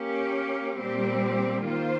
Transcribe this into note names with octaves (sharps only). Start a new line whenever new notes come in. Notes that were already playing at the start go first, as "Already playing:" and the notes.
Already playing: A#3 C#4 G4
A#2 G3 C4 G4
D#3 A#3 F4 C5